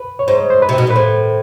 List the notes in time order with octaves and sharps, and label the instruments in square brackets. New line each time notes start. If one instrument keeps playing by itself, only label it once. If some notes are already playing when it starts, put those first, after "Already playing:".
Already playing: [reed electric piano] B4
C#5
[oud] G#2 [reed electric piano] C5
[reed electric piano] C5
B4
[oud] C3
B2
A#2
[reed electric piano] B4
[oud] A2 [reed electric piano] C5